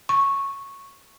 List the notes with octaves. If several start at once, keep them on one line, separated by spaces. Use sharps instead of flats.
C#6